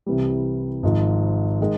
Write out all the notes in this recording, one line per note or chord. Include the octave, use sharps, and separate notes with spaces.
C2 C3 E3 G3
G#1 G#2 F3
D#3 G#3